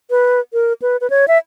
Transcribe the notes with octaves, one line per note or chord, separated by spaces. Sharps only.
B4
A#4
B4
B4
C#5
E5